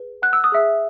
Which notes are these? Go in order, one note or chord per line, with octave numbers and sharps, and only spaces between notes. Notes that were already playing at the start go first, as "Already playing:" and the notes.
Already playing: G#4 B4
F#5 F#6
E6
D#6
G#4 E5 E6